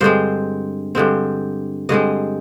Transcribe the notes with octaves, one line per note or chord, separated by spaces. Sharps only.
G2 D3 G#3 C4 C5
G2 D3 G#3 C4
G2 D3 G#3 C4 D#5